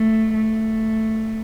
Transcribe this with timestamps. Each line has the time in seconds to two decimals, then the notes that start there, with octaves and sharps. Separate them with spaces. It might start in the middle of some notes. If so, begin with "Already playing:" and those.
Already playing: A3
0.35 A3